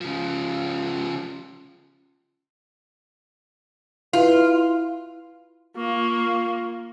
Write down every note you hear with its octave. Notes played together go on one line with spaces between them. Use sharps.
C#3 F3
E4 F4 B4 F5
A#3 F4 F5 C#6